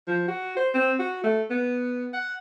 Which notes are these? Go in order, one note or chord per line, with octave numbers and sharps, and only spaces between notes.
F3
F#4
C5
C4
F#4
A3
B3
F#5